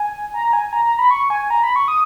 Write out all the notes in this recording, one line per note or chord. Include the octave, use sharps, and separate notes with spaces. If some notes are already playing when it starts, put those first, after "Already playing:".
Already playing: G#5
A#5
G#5
A#5
A#5
B5
C#6
G#5
A#5
B5
C#6
D#6